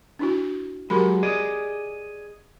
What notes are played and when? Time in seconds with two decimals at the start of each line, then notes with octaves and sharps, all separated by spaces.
0.19 D4 E4 F#4
0.90 F#3 G#3 G4 A#4 B5
1.23 G#4 D5 D#5